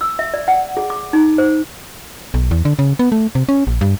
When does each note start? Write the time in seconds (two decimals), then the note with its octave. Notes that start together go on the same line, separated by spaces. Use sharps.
0.01 E6
0.19 E5
0.34 D5
0.48 F#5
0.77 G#4
0.90 D6
1.13 D#4
1.38 C5
2.34 B1
2.51 E2
2.65 D3
2.79 C#3
2.99 B3
3.12 A3
3.35 C3
3.49 C#4
3.67 A#1
3.81 G2